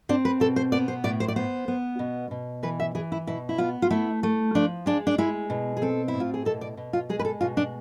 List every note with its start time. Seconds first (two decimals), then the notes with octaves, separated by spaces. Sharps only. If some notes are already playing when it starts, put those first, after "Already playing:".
0.09 C4 D4
0.25 B4
0.40 B2 A4
0.56 C5
0.72 B3 D5
0.88 C5
1.04 A2 D5
1.20 C5
1.28 D5
1.36 B3 C5
1.68 B3
1.99 B2
2.31 B2
2.63 E3 B4
2.80 E5
2.95 E3 G#4
3.12 E4
3.27 B2 E4
3.49 E4
3.58 B3 F4
3.82 F4
3.90 A3 E4
4.23 A3
4.55 F3 D4
4.86 G#3 D4
5.07 D4
5.18 G#3 E4
5.50 B2
5.77 G#4
5.82 C4 A4
6.08 E4
6.14 A2
6.20 F4
6.34 G#4
6.45 B2 A4
6.61 D5
6.77 B2
6.93 F4
7.09 G#3 G#4
7.19 B4
7.25 A4
7.41 B2 F4
7.57 D4